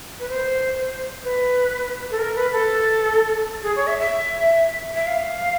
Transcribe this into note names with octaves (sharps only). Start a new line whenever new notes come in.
B4
C5
B4
A4
A#4
B4
A4
G#4
C#5
E5
E5
E5
F5